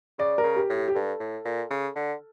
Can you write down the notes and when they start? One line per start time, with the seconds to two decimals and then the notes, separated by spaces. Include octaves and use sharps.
0.19 C#3 D5
0.38 A#4
0.44 C#3
0.56 G4
0.69 A2
0.76 G4
0.88 G4
0.94 G2 A4
1.20 A2
1.45 A#2
1.70 C#3
1.96 D3